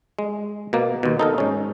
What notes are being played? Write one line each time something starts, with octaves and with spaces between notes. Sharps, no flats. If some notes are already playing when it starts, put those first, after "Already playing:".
G#3
B2 A#3
D#2 B2
D#4 A4 A#4
G#2 C#4